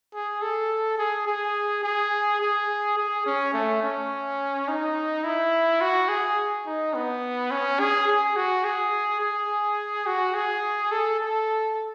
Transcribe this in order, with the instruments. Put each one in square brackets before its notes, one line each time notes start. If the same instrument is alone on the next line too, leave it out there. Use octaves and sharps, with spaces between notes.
[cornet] G#4
A4
G#4
G#4
G#4
G#4
G#4
C#4
A3
C#4
D#4
E4
F#4
G#4
D#4
B3
C#4
G#4
G#4
F#4
G#4
G#4
F#4
G#4
A4
A4